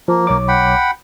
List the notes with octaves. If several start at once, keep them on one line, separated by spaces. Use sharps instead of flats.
F3 A#3
B1 C#5 D6
F#5 G5 B5